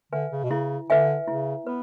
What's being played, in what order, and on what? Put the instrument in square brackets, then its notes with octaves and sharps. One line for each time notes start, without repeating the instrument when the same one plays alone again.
[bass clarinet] D3 [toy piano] B4 E5 G#5
[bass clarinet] C#3
B2
[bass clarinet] C#3 [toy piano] E4
[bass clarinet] D3 [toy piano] B4 E5 G#5
[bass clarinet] C#3 [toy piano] E4
[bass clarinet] B3 [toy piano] B4